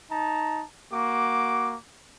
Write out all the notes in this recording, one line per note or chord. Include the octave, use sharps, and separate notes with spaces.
D#4 A5 A#5
A#3 F#4 D6